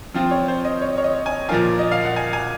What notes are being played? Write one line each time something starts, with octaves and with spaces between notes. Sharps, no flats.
F3 C4 F4
C#5
C5
D#5
C#5
C#5
D#5
G#5
A#2 F3 A#3 F4 G#5
D#5
F5
F#5
G#5
G#5